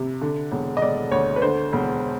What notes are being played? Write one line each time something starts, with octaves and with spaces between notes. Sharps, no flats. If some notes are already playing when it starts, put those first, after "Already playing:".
Already playing: C3
D3
E1
D#5
E1 D5
D2 C#5
B4
D3 C5
E1